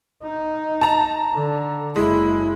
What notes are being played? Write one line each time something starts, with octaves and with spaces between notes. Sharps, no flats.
D#4
A5 A#5
D3
F#1 G#3 E4